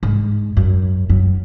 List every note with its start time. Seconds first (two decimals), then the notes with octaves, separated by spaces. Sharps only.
0.03 G#2
0.57 F#2
1.10 F#2